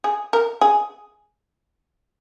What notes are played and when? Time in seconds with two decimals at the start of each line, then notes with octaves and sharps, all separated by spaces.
0.04 G#4
0.33 A#4
0.61 G#4